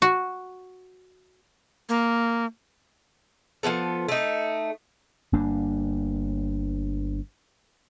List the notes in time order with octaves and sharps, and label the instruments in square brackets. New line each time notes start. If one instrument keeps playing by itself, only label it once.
[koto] F#4
[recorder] A#3
[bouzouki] F3 G#3 B3 A4
A3 D#4
[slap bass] G1 G2 A#3 D4